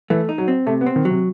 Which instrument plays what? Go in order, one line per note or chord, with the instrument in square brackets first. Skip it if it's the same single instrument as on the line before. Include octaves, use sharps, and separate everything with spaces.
[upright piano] E3 [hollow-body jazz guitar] A3
[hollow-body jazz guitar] D#4
[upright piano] F#3
[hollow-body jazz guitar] C4
[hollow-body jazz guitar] C3 [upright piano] A3
[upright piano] B3
[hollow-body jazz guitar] C4
[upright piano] D#3
[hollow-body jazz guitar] F#3
[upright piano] C3